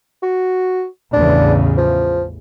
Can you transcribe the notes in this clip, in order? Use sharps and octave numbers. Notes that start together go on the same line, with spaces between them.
F#4
A1 E2 C#3 D4
F3